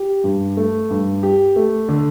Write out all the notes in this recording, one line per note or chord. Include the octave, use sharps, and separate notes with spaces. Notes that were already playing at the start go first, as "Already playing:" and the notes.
Already playing: G4
G2
A3
G2
G4
A3
D3